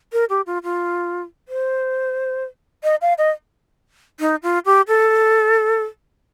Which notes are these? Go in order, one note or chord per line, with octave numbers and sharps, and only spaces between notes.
A#4
G4
F4
F4
C5
D#5
F5
D#5
D#4
F4
G4
A4